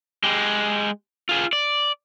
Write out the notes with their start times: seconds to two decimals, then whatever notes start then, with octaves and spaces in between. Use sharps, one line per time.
0.24 G#3 G4
1.29 F4 G#4
1.53 D5